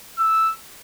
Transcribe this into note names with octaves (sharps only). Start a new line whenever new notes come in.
E6